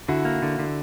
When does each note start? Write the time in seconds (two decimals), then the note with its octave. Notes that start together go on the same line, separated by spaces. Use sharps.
0.08 D3 E4 F#4
0.25 A#3
0.43 D3
0.59 D3